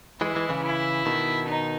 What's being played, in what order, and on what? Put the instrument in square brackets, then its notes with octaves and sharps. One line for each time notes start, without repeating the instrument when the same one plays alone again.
[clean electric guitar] E3 G#3 [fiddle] E4
[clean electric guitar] E3 G#3
C#3 E3
[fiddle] E4
[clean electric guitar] B2 D#3
[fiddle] D#4